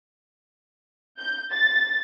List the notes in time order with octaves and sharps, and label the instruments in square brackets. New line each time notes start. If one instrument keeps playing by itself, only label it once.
[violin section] G6
A6